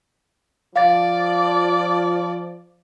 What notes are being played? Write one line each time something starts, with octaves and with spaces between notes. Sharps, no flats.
F3 D5 F5 A6